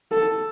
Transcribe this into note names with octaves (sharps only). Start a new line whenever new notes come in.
A4